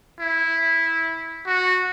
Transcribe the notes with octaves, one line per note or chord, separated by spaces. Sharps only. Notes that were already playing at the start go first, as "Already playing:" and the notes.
E4
F#4